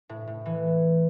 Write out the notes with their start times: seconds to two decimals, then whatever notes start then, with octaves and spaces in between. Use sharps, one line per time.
0.09 A2
0.27 A2
0.46 E3